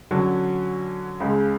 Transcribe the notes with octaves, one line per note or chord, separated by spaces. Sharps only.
D3 F#3 C#4
C#2 C#3 G#3